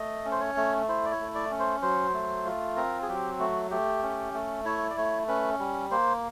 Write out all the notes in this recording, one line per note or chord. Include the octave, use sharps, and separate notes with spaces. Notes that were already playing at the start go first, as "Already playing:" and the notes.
Already playing: A3 D#5
C#4
C5
C#5
A3
E4 C5
D5
C#5
A3
D5
C#4
C5
F#3 C5
A3
F4
C4 A#4
G#4
F#3 G4
A3 F#4
A3 G4
C#4
A3
E4 C#5
D5
A3 C#5
C#4 B4
G3
A#3 C5